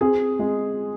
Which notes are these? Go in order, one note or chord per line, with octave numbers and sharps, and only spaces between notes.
C4 G#4
G#3